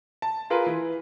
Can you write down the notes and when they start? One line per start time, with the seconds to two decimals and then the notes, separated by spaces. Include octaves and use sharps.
0.22 A5
0.50 F4 G#4 A#4 B4
0.66 E3